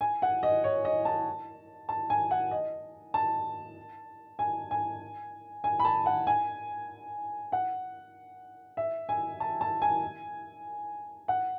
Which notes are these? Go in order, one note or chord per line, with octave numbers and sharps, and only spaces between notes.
G#5
F#5
D#5
C#5
D#5
A5
A5
G#5
F#5
D#5
A5
G#5
G#5
G#5
B5
A5
F#5
G#5
F#5
E5
G#5
A5
A5
G#5
F#5